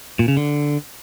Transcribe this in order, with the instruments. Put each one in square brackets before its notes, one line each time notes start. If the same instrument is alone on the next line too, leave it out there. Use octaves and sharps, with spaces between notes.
[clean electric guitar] A#2
C#3
D3